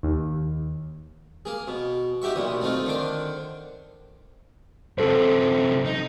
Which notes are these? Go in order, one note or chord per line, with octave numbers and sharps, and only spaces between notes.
D#2
A#3 G#4
B2
D#4 F#4 G4 E5 C#6
B1 A#2 D#6
A3 C4 D#4 F4
D3 D#3 D4 C5
F#2 C3 A4 C5
D#4